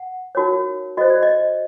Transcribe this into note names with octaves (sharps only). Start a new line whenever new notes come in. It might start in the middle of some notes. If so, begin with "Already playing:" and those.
Already playing: F#5
D#4 F#4 A#4 C#5
F#4 A4 C5 D#5
D5
D#5